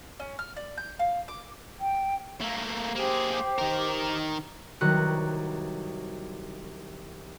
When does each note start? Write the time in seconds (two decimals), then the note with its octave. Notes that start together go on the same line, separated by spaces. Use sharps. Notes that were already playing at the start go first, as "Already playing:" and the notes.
0.20 C#4
0.39 F6
0.56 D5
0.77 G6
0.99 F5
1.28 D6
1.81 G5
2.41 A3 A#3
2.95 A#3 G4 G#4 C5
3.58 D#3 A#4
4.81 C2 D#3 F#3 F#4 B4 F#6